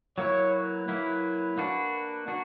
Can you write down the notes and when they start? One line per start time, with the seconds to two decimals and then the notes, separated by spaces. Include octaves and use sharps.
0.17 F#3 A#3 E4 C#5
0.52 B4
0.88 F#3 A#3 E4
1.58 A#3 D4 F#4
2.28 A#3 D4 F#4